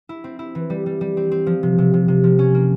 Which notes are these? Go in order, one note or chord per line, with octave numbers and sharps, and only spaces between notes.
E4
C4
E4
E3
G3
G3
G3
C4
C4
F3
C3
C3
C3
C3
F3
C#4
A#3